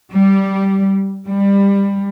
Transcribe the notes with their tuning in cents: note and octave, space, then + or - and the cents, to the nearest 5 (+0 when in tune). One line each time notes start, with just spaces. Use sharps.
G3 -10
G3 +20